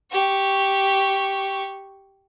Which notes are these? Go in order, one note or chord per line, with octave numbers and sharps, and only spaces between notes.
G4 C#6